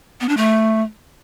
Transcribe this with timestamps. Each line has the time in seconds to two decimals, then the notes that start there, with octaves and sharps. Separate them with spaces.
0.21 B3
0.29 D4
0.37 A3